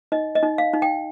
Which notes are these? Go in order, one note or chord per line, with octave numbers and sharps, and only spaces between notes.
D#4 D#5
D#5
D#4
F5
D#4
G5